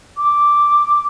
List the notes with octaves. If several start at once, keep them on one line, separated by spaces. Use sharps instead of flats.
D6